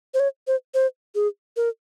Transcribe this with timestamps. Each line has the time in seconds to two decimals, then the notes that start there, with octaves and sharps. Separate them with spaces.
0.14 C5
0.20 C#5
0.47 C5
0.74 C5
1.15 G#4
1.57 A#4